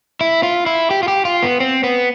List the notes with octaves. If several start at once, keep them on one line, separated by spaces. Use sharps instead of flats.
E4
F4
E4
G4
F4
G4
F4
B3
C4
B3